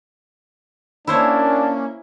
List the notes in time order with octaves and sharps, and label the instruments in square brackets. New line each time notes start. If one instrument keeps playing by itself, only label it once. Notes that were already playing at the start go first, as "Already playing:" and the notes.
[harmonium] A#3 C#4 [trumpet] D4 [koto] E4 C5 C#5